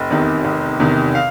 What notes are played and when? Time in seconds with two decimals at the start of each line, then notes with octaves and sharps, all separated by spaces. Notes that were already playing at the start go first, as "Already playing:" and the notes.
Already playing: F1
0.10 E2 C3 D#3
0.45 F1
0.80 E2 C3 D#3
1.15 F5